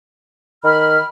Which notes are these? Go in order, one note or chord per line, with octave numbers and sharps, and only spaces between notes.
D#3 B5 F6